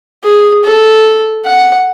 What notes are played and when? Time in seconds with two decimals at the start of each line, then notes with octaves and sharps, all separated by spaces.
0.24 G#4
0.64 A4
1.46 F#5